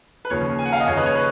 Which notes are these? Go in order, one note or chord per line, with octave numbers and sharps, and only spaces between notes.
B4
D#2 C#3 F3 C#5
G#5
F#5
F5
D#5
D#2 C#3 F3 C#5
B4 D#5
C#5
B4